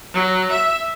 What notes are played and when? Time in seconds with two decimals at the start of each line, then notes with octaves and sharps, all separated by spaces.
0.14 F#3
0.51 E5